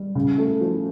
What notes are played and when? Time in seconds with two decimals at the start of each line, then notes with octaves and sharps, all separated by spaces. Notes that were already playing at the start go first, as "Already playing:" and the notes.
Already playing: G3
0.15 C#3
0.38 A3
0.61 F3